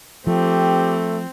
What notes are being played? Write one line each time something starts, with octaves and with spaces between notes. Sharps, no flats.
F3 A3 C4 G4